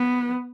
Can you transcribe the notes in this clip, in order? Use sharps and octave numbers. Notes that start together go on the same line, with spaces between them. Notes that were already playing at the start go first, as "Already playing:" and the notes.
Already playing: B3